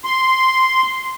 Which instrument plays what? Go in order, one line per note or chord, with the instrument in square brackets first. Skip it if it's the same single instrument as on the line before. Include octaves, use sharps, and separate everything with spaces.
[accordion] C6